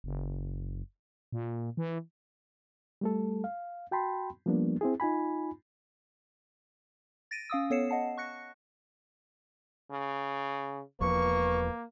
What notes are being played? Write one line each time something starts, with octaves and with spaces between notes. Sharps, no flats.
F#1
A#2
E3
G3 A3 A4
F5
F#4 G5 A5 B5 C6
F3 G3 A#3 B3 D4
C4 E4 G#4
D#4 F4 G#5 B5
A6 A#6 D7 D#7
C#4 F5 D#6 E6
B3 A4 C#5 C7 C#7 E7
D#5 F#5 A5 C7
C#6 F#6 A#6 C#7
C#3
E1 E2 F3 A#3 B4 C#6